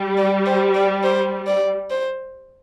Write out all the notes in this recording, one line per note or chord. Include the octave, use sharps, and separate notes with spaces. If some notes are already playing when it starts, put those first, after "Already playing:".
Already playing: G3
D5
C5
D5
C5
D5
C5